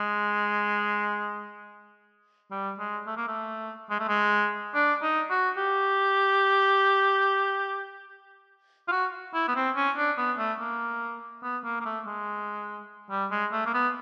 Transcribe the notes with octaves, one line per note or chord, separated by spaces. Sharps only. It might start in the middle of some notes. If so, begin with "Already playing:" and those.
Already playing: G#3
G3
G#3
A3
A#3
A3
G#3
A3
G#3
D4
D#4
F#4
G4
F4
F#4
E4
B3
C4
C#4
D4
B3
A3
A#3
B3
A#3
A#3
A3
G#3
G3
G#3
A3
A#3
B3